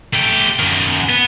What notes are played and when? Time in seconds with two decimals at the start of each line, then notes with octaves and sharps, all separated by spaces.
0.14 A3 G4
0.59 F#2 D#3
1.09 B3